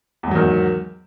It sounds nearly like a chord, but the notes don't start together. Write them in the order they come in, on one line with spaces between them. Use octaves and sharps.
E2 G#2 F#3 D#3